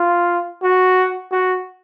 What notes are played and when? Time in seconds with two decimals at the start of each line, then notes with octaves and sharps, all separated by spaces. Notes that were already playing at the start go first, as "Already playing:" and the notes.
Already playing: F4
0.63 F#4
1.32 F#4